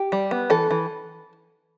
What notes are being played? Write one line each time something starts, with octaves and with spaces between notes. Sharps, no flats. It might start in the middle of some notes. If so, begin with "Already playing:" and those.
Already playing: G4
G3
B3
E3 A4
E3